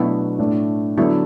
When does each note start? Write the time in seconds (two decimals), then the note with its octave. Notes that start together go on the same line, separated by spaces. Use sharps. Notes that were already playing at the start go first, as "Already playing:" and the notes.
Already playing: B2 F#3 A3 B3 D4 E4 F#4
0.39 A2 A3 D4
0.98 D3 F#3 B3 D4 E4 A4